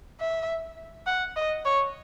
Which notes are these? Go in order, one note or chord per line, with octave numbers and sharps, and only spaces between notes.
E5
F#5
D#5
C#5